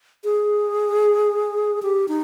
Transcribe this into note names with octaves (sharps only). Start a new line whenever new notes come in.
G#4
G4
D#4